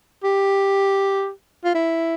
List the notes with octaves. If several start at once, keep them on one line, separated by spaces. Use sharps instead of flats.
G4
F4
E4